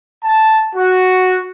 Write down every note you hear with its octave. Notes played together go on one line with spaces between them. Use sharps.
A5
F#4